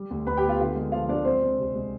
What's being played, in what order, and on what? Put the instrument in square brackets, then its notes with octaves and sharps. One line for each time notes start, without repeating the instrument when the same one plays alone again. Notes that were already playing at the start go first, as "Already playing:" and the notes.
Already playing: [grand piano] G3
D2
D2 B4 B5
G4 G5
B3
F4 F5
D3 F4 F5
G#3
F3 F4 F5
G#3 D4 D5
G#3 C4 C5
G#3
C2
G#3